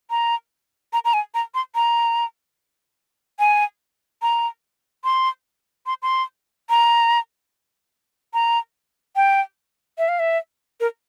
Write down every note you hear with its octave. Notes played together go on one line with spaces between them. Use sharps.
A#5
A#5
A#5
G#5
A#5
C6
A#5
G#5
A#5
C6
C6
C6
A#5
A#5
G5
E5
F5
E5
A#4